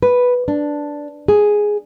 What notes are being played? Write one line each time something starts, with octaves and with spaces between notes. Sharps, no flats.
B4
D4
G#4